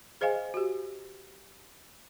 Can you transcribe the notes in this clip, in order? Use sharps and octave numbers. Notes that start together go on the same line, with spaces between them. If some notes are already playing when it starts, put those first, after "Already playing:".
G#4 C5 D#5 F5 G#5
F#4 G4